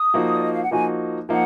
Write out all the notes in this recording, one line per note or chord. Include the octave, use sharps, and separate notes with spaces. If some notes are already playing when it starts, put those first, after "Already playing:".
Already playing: D#6
F3 A#3 D#4 F#4
D5
D#5
F5
F#5
F3 A#3 D#4 F#4 G#5
F3 A#3 D#4 F#5